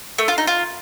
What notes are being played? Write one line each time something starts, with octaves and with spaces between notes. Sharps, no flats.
A3
F4
D#4
F4